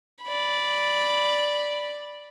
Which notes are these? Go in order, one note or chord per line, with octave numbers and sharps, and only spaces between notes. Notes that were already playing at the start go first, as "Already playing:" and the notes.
D5 B5